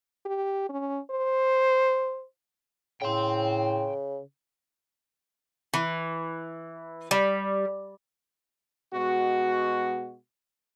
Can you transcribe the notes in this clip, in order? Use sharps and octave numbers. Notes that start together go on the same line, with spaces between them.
G4
C#4
C5
A2 C#3 G5 C6
E3
G3
B2 G#3 F#4